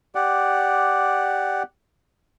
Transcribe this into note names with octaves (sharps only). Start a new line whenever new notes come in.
G4 D5 F#5